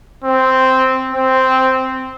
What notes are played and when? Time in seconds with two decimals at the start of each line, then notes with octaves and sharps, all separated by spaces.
0.24 C4
1.12 C4